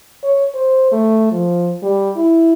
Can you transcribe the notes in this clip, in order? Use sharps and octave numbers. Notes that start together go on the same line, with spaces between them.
C#5
C5
A3
F3
G3
E4